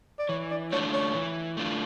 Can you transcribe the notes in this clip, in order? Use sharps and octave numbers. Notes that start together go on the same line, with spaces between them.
D5
E3 C#5
D5
A3 D4 F4 C#5
C#5
E3
A3 D4 F4